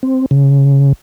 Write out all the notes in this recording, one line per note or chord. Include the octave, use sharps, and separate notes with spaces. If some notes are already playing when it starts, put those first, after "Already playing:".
C4
C#3